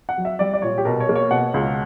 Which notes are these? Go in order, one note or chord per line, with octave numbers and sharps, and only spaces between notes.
F#5
F#3
E5
G3 D5
D5
A#2 C#5
G4
B2 A#4
C#5
A#3
C#5
B2 F#5
C#2